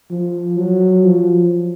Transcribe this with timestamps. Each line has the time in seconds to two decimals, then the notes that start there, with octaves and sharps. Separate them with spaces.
0.11 F3
0.57 F#3
1.04 F3